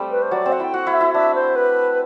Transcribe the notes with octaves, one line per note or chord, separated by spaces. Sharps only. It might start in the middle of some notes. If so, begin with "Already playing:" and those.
Already playing: G3 A3 C4 G4
B4
C5
F#3 D5
C4
F#5
E4 G5
F#4 F#5
E4
E5
E4
D4 E5
C5
B4